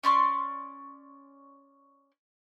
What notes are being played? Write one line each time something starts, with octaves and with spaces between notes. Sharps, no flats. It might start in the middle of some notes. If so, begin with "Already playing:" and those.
C#4 D5 C6 C#6